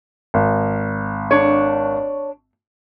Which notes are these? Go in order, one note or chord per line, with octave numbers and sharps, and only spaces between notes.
G#1
D4 C#5